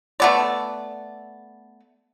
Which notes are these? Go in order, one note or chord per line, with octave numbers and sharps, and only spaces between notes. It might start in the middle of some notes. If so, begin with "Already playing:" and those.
A3 B3 D5